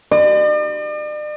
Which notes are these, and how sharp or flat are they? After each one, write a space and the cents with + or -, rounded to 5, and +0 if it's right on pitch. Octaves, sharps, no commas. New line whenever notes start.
D5 +45